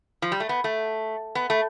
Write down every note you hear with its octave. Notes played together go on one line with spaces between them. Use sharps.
F3
G3
A3
B3
A3
B3
A3